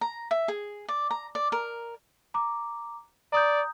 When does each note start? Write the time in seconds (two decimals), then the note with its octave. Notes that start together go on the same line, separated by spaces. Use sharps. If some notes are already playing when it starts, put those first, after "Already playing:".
0.01 A#5
0.31 E5
0.48 G#4
0.89 D5
1.11 A#5
1.35 D5
1.52 A#4
2.34 A#5 D6
3.33 D5 A#5 D#6 G6